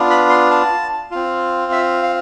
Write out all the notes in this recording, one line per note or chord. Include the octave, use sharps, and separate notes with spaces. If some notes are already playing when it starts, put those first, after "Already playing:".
Already playing: B3 D4 F4
B5
C6
A5
C4 F4
E5
F5